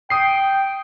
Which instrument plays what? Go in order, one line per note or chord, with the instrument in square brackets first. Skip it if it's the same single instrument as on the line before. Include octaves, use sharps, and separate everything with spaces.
[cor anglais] G5 [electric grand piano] D#6 C7